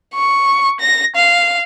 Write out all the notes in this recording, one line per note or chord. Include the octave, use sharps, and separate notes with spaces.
C#6
A#6
F5